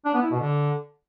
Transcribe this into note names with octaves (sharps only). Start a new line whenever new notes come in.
D4
B3
E4
B2
D3